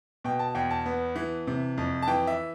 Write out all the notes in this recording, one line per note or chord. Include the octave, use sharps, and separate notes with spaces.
B2 G5
A5
E2 G5
A5
B3
E3
C3
F2
A5
E3 G5
E5